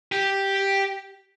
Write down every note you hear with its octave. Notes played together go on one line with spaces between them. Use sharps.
G4